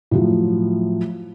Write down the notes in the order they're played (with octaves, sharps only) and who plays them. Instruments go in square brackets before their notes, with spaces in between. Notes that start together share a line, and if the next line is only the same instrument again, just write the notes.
[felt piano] A2 F3 F#3